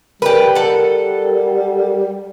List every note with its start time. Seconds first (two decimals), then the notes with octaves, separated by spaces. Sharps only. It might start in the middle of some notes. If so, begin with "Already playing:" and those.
0.22 G3 G4 A#4 B4
0.55 A4 F#5